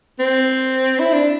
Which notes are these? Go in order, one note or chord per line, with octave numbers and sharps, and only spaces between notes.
C4
E4
D4